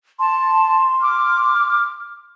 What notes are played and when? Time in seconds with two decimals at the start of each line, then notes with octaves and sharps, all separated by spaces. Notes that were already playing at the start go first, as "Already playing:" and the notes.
0.19 A5 C6
1.00 D6 F6